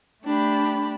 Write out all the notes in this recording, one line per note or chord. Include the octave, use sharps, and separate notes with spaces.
A3 D4 G4 B5